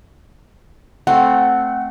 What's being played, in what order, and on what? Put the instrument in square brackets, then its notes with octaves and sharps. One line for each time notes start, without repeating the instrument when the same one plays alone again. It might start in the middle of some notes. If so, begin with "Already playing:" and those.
[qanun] A3 C4 [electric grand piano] F#5